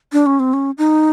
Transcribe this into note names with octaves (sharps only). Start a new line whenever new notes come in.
D4
C#4
C4
C#4
D#4